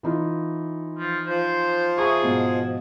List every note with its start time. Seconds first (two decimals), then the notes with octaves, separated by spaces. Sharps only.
0.03 E3 D#4 F4
0.98 F3
1.27 F3 C5
1.98 G#4 E5 A#5 C#6
2.23 G#2 B2